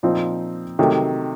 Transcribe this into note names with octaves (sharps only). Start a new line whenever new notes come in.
A#2 F3 C4 D#4
C3 D#3 F#3 A3